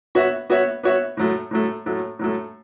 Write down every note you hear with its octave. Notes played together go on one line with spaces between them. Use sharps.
B3 F#4 C#5 E5
B3 F#4 C#5 E5
B3 F#4 C#5 E5
A2 F#3 A3
A2 F#3 A3
A2 F#3 A3
A2 F#3 A3